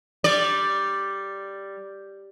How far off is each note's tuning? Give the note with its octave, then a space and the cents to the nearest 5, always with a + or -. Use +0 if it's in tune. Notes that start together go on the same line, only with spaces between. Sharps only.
G3 +0 D5 +0